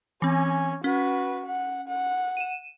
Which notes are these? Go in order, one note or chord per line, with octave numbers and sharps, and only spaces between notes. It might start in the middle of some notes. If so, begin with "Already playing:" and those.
E3 C4 C#4 G#5
C#4 F#4 B4
F#5
F#5
D#7 E7